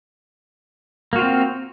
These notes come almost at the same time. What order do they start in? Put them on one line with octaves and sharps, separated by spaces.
A#3 F#4 F4 C4